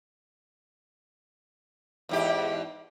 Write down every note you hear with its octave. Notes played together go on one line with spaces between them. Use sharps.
E2 G#2 G4